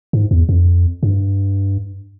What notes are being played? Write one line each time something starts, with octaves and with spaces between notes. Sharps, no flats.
G#2
E2
F2
G2